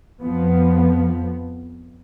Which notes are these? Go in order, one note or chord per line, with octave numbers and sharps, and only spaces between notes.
F2 F3 B3